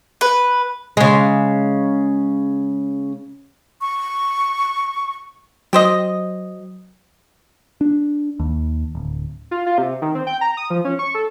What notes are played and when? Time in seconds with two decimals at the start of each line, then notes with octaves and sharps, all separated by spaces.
0.21 B4
0.97 C#3 G#3
3.81 C#6
5.73 F#3 G4 C5 D#5
7.81 D4
8.40 D#2
8.95 D1
9.51 F4
9.66 F4
9.78 C3
10.02 D#3
10.15 C4
10.27 G5
10.41 A#5
10.57 D#6
10.70 F3
10.85 C#4
10.99 C#6
11.15 A4